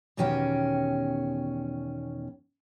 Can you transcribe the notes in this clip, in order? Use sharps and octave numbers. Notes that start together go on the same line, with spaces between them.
E2 B2 D#3 C#4 G4 G5